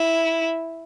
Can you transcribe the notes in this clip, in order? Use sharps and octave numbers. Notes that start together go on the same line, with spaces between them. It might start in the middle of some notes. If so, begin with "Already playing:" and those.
Already playing: E4